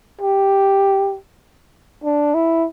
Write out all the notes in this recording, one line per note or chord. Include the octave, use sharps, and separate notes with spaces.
G4
D4
E4